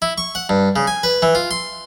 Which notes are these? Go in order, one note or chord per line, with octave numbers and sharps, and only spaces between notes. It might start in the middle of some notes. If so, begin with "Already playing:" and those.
E4
C#6
F#5
G2
C#3
G#5
B4
E3
F4
C6